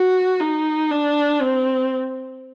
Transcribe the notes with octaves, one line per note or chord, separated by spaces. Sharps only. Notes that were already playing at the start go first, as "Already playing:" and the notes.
Already playing: F#4
D#4
D4
C4